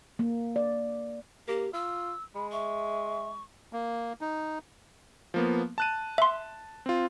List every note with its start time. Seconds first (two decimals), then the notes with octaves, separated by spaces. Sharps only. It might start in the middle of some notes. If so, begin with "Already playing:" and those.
0.19 A#3
0.56 D5
1.48 A#3 G4
1.73 F4 E6
2.35 G#3 B5
2.52 E5 C#6
3.73 A#3
4.21 D#4
5.34 F3 A#3 B3
5.78 A5 F#6 D#7
6.18 E5 C6
6.86 C4 F4